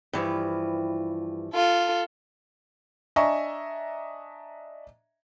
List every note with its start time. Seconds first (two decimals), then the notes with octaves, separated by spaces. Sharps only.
0.13 G2 E3 F3
1.54 F4 A4
3.16 D4 D#5 E5 G#5 A#5 C#6